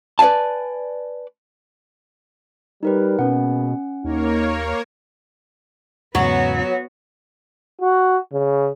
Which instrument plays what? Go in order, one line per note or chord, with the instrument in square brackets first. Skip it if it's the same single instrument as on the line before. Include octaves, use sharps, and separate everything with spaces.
[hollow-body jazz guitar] B4 D5 F5 G#5 A5
[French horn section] G3 [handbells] D#4 A#4 B4
[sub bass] B2 [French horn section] G#3 A#3 B3 [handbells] C#4 F#5
[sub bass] D#2 [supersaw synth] A#3 A#4 C#5 [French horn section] D#4
[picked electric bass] E2 G#2 C#3 [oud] F#3 [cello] B3 F#4 [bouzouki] C#5
[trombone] F#4
C#3